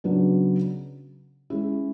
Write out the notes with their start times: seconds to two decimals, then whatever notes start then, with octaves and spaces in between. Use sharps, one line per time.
0.04 C#3 F#3 B3 D4
1.50 G#3 C#4 E4